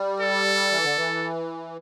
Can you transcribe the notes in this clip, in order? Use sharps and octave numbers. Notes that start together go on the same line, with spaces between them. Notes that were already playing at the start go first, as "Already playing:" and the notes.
Already playing: G3
A4
E3
D3
E3